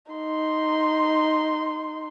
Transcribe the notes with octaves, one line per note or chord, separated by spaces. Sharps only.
D#4 C6